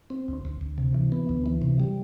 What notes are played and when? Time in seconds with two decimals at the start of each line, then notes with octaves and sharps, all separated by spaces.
0.10 C4
0.28 D2
0.45 D2
0.61 D2
0.78 C3
0.94 E3
1.12 B3
1.29 D2
1.46 E3
1.62 C3
1.80 G3